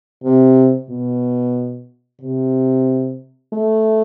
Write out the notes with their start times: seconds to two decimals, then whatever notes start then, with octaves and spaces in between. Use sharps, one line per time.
0.24 C3
0.90 B2
2.22 C3
3.53 A3